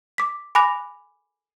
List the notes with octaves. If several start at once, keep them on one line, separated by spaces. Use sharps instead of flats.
D6 B6
G#5 B5 D6 F#6 A#6 F7